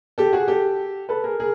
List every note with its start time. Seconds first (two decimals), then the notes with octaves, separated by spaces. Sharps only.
0.18 G4 A4
0.33 F#4 G#4
0.48 G4 A4
1.09 A4 B4
1.24 G#4 A#4
1.40 G#4 A#4